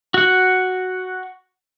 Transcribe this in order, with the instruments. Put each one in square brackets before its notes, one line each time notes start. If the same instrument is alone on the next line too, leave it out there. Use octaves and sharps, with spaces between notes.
[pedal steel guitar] F#4 F#5